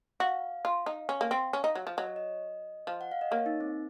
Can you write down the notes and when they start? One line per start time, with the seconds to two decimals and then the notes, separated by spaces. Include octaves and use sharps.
0.20 F#4 F5
0.65 F4
0.86 D#4
1.09 C#4
1.21 A#3
1.31 C4
1.53 C#4
1.64 D#4
1.75 F#3
1.87 F3
1.97 F#3 D#5
2.07 C#5
2.16 D#5
2.87 F3
3.01 F#5
3.11 F5
3.21 D#5
3.31 A#3 C#5
3.46 D#4
3.60 C4